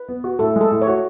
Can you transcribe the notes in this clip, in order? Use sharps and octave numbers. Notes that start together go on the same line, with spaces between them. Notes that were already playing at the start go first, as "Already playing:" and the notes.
Already playing: B4
B3
F#4
A2 A4
G#3
A4
A2
C#5
F#4